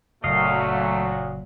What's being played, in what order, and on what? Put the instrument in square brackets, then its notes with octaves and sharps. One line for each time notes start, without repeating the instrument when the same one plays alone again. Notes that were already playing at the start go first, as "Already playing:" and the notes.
[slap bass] F#1 [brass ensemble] A#2 F#3 [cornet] A3 [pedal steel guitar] D#5 F5